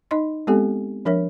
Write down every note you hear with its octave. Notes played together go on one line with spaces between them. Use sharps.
D#4 D#5 C6
G#3 B3 C4 G4 A4 G#5
F3 D4 A#4 C#5 E5